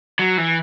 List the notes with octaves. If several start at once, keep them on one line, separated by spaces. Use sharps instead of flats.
F#3
E3